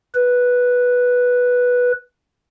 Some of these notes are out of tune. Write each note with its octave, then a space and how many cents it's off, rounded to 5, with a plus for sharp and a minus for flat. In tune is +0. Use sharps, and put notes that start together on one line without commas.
B4 -5